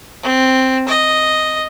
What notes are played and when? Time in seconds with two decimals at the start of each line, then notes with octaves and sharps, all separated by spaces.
0.23 C4
0.88 D#5